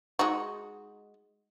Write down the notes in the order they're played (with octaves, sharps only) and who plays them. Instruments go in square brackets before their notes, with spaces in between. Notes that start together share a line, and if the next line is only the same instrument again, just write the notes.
[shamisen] G#3 D#4 F#4